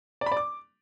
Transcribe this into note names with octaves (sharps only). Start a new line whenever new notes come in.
D5
B5
D5
D6